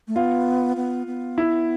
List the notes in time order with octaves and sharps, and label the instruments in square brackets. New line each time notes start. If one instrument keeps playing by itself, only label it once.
[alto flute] A3
[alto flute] B3 [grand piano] F4
[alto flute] B3
B3
[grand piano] E4